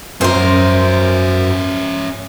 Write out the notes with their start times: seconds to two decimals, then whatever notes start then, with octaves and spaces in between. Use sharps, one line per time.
0.21 F#2 C#4 A#4 C5 E5